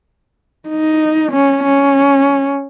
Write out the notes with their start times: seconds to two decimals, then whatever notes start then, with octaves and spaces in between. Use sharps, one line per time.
0.69 D#4
1.32 C#4
1.64 C#4